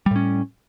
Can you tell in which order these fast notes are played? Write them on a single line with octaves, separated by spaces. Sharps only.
G3 A2 C#4